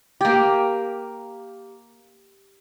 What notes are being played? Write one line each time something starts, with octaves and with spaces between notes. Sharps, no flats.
A#3 G4